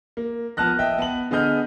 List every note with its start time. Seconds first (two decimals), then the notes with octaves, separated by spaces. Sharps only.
0.17 A#3
0.57 F3 B3 A5 F6 F#6 A#6
0.79 D#5 E5 G5
0.98 B3 A5 F#7
1.31 D3 B3 G#4 D#5 F6 G6